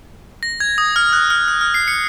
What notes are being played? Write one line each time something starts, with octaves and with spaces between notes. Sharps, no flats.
A#6
G#6
D#6
F6
F#6
F6
F#6
F6
C7
C#7